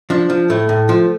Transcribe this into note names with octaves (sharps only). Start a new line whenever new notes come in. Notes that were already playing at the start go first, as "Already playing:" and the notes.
F3 D4
F3
A2 A3
A2
F3